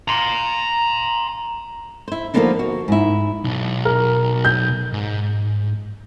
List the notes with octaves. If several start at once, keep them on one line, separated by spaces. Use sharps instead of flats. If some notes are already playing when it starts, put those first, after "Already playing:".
A#5 C6
E4 C5
D3 F3 A#3 B3 D4 D#4
F#4
G#2 E4
B1
A#4
G6
G#2